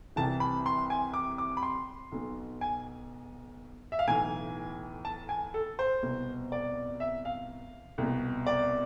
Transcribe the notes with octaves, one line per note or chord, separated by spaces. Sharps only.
C2 C3 E3 A5
B5
C6
G#5
D6
D6
B5
C6
B1 B2
G#5
E5
F5
B1 A2 E3 G#5
A5
G#5
A4
C5
C2 B2
D5
E5
F5
C2 B2
D5